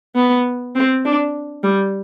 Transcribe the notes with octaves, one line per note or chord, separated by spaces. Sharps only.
B3
C4
D4
G3